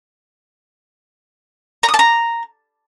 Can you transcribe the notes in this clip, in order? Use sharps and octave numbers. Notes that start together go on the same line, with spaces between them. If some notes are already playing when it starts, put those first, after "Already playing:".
A#5
D#6
A5
A#5